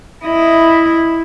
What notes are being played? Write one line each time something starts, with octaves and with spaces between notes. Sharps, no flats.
E4 D#5